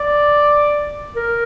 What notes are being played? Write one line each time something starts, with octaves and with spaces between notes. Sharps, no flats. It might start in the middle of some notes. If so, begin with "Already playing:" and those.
Already playing: D5
A#4